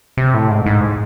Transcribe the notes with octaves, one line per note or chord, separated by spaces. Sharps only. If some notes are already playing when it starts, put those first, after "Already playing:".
C3
A2
G#2
G#2